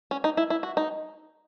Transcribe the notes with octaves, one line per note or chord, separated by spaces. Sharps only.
C#4
D#4
E4
E4
F#4
D#4